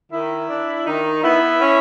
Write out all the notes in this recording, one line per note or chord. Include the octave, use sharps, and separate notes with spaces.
D#3 E4
D4
D#3 D#4
B3 E4
C#4